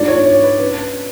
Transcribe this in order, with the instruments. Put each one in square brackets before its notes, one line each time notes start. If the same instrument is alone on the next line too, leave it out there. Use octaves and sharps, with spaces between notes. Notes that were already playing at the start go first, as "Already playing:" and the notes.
Already playing: [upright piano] G#2 G#3 D4 F4 [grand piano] D5
[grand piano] C#5
C#5
B4
[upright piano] C#4 [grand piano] B4